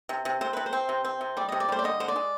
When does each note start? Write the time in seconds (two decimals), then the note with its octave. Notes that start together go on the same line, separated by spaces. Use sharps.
0.09 C3
0.25 C3
0.41 C3 C5
0.53 C3 B4
0.66 C5
0.73 C4
0.89 C3
1.04 C4
1.21 C3
1.37 G3 D5
1.49 C3 D#5
1.60 D5
1.69 G3 C5
1.79 D5
1.84 D3 D#5
2.00 D3 C5
2.08 D5
2.16 G#3